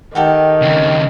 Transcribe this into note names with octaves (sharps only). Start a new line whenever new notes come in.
D#3 G4 A4 F#5
D#2 C#3